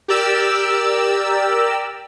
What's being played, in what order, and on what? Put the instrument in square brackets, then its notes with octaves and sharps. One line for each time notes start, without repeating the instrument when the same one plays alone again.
[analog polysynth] G4 A#4 D5 E6